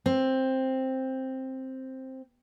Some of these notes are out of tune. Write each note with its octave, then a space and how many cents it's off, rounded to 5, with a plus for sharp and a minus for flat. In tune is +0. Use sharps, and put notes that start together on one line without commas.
C4 +5